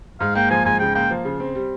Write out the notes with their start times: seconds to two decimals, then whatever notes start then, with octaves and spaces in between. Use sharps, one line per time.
0.20 G#2 F5
0.35 A#3 G5
0.50 F3 G#5
0.65 G#2 G#5
0.80 C#3 G5
0.95 A#3 G5
1.11 F3
1.25 C#3
1.40 C4
1.55 G3